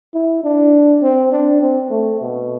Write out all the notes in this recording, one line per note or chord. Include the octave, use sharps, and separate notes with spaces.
E4
D4
C4
D4
C4
A3
B2